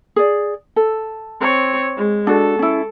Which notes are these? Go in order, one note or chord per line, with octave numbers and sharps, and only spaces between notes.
G#4 D5
A4
C4 C#5
G#3
D4 F#4 A4
C#4 E4